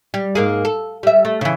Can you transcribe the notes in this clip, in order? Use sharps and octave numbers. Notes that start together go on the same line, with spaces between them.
G3
G#2 A#3 G#4
A4
G3 E5
A3
C#3 E3